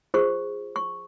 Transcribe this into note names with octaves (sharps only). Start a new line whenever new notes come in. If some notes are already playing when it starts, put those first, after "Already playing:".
F4 G#4 C5 C#6
C#6